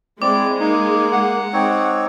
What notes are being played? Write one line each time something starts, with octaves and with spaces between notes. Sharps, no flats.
G#3 C4 E4 D5 D6
A#3 D#4
F#5
C4 D#4 C#5